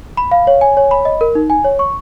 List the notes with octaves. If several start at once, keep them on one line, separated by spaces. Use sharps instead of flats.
B5
F5
C#5
G#5
C#5
B5
D#5
A#4
D#4
G#5
C#5
C#6